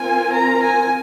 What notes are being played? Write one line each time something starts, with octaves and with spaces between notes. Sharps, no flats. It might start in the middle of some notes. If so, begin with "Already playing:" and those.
Already playing: C4 F4 A#4 G#5
A#5
G#5